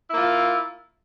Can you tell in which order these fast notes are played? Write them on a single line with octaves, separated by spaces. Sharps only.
E4 A#3 F4